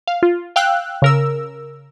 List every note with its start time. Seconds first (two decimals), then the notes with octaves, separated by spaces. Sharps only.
0.07 F5
0.23 F4
0.56 F5 G5 E6 F#6
1.02 C#3 A#4 E6